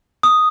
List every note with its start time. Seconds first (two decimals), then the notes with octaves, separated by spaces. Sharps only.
0.23 D#6